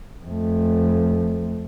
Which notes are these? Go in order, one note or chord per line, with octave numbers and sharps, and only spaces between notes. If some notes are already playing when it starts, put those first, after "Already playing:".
F2 A3